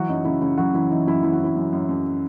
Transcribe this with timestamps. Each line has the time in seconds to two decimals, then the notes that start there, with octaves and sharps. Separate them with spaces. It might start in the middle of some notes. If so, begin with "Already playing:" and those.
Already playing: E3 F#3 F#4
0.08 F#2 D#4
0.25 C#3 E4
0.42 C#3 E4
0.57 C#3 F#3 F#4
0.74 E3 E4
0.91 E3 D#4
1.07 F#2 E4
1.23 E3 E4
1.33 F#4
1.40 E3 E4
1.56 F#2
1.73 F#2
1.89 F#2